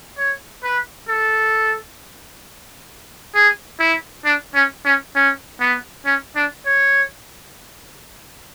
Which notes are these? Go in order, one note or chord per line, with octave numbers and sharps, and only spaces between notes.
C#5
B4
A4
G#4
E4
D4
C#4
C#4
C#4
B3
C#4
D4
C#5